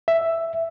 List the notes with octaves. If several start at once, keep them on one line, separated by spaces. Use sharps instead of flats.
E5